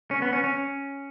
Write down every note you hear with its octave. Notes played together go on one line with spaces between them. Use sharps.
C#4
B3
C#4
C#4